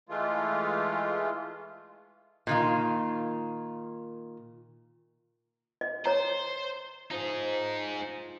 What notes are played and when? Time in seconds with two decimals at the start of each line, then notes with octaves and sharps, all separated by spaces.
0.09 E3 G#3 A3 F4
2.47 A#2 D#3 F4
5.81 D#5
6.06 C5 C#5 A#5
7.11 F3 D#4 G#4